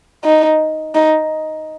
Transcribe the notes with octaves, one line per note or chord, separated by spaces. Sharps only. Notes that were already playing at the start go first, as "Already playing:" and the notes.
D#4
D#4